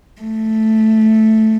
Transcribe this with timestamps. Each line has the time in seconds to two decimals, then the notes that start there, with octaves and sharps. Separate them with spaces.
0.22 A3